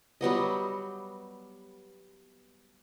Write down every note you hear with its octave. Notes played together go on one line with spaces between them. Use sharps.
F#3 G3 B3 D#5